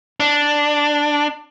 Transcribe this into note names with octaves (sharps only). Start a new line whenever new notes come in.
D4